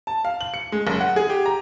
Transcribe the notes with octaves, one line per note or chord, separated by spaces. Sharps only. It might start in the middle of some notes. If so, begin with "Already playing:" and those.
A5
F5
F#7
C#7
G#3
F#1
F#5
G#4
G4
A#5